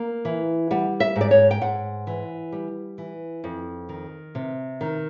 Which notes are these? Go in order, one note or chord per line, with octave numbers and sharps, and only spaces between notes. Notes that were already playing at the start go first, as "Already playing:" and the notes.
Already playing: A#3
E3
G3 F#5
E5
G#2
D5
C#5
G5
G#2 F#5
E3
G3
E3
F2
D#3
C3
D#3